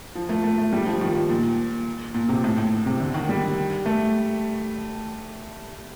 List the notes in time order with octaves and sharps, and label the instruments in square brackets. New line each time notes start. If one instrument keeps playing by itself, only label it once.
[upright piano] F3
A3
A3
A3
G3
F3
D#3
F3
A#2
A#2
C3
A2
A2
C3
D3
D#3
G3
A3